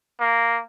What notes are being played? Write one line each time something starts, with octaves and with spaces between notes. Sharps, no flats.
A#3